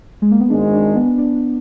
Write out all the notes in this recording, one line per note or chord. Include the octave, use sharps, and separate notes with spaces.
G#3
A#3
B3
G#1 G#2 D#3 G#3 D4
D4
B3
D4